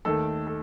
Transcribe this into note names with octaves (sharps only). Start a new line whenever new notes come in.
D#2 D#3 A3 A4
A4